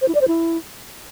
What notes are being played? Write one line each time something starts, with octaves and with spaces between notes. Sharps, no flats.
C5
E4
D5
C5
E4